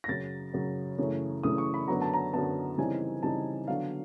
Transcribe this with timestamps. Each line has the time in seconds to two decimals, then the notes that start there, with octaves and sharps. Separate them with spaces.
0.04 A#6
0.08 F#2 C#3 F#3 A6
0.53 F#2 C#3 F#3
0.98 F#2 C#3 E3 A3 C#4
1.43 F#2 C#3 E3 A3 C#4 D#6
1.58 C#6
1.74 B5
1.88 F#2 D3 F#3 B3 A#5
2.02 A5
2.13 A#5
2.33 F#2 D3 F#3 B3 A5
2.78 C#3 E3 G3 C4 D#4 G#5
3.23 C#3 E3 G3 C4 D#4 A5
3.67 D3 F#3 B3 D4 F5